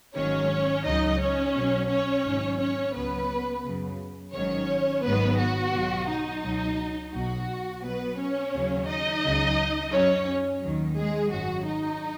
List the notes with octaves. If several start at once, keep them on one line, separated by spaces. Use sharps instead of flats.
G#1 G#2 D#3 F#3 C#4 C#5
C#2 C#3 F#3 D#4 D#5
C#4 C#5
B1 B2 F#3
C#4 C#5
G#1 G#2 F#3
C#4 C#5
C#2 C#3 F#3 B3 B4
F#2 C#3 F#3
G#1 G#2 D#3 F#3 C#4 C#5
G#1 G#2 D#3 F#3 B3 B4
F#4
B1 B2 F#3
D#4
C#2 B2 F#3
B1 B2 F#3 F#4
B1 B2 F#3 B3 B4
C#4 C#5
D#2 C#3 F#3
D#4 D#5
C#2 C#3 F#3
F#2 F#3 C#4 C#5
D#2 D#3 F#3
G#3 G#4
G#1 F#2 F#3 F#4
D#4